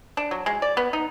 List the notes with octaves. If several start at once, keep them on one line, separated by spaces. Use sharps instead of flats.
D4
F#3
G#3
D5
B3
D#4